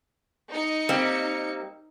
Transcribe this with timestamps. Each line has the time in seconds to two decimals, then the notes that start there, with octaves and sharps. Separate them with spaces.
0.52 D#4 C#7
0.89 G3 A#3 C4